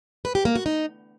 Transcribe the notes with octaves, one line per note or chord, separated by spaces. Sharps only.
B4
G4
A#3
F#4
D#4